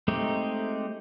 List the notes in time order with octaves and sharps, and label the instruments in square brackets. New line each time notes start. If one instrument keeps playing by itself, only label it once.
[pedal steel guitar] G#3 A3 C4 D#4 G4